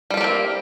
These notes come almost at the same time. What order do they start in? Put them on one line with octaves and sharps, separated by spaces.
G3 F4 G4 A#3 C4